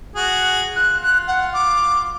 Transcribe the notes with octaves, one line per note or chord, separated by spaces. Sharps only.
F#4 G#4 F#5
F4 F#6
F#6
F#5
D6